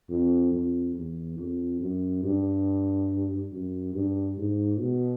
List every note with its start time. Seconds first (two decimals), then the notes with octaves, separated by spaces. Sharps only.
0.09 F2
0.53 F2
0.96 E2
1.38 F2
1.81 F#2
2.23 G2
3.52 F#2
3.94 G2
4.38 G#2
4.79 B2